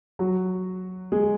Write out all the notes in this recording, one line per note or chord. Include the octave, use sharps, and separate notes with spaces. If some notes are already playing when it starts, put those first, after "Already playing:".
F#3 F#4
G#3 G#4